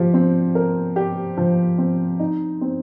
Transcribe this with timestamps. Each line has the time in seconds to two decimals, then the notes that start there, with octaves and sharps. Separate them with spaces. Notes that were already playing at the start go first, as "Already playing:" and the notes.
Already playing: F3 G4
0.14 C4
0.55 A#4
0.96 G4
1.37 F3
1.78 C4
2.19 D#4
2.61 C4